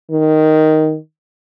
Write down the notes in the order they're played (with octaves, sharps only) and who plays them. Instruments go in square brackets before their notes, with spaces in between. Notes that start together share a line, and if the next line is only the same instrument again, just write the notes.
[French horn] D#3